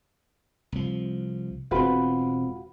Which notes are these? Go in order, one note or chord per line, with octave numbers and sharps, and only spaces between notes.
C2 F3
E1 C4 F4 F#4 B4